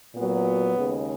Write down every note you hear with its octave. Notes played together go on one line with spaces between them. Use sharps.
A#2 F#3 B3
D#2 C#3 G#3